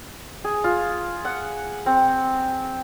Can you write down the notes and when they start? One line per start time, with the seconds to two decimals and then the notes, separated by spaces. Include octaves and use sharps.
0.44 G#4
0.64 F4
1.25 F#5
1.86 C4